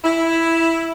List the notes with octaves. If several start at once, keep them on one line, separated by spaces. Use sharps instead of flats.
E4